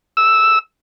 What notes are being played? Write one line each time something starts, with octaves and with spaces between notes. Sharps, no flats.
E6